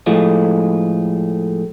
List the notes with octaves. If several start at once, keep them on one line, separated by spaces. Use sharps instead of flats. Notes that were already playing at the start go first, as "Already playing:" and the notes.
A2 F3 G#3